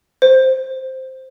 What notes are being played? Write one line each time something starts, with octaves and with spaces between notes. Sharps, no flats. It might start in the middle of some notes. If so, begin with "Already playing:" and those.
C5